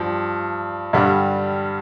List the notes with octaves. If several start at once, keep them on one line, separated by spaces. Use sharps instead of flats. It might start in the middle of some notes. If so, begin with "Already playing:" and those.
Already playing: G2 F3
G2 D3 G3